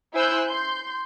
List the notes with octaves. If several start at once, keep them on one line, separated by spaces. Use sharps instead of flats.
E4 C5 G#5 E6 F#6 G6
C6 G6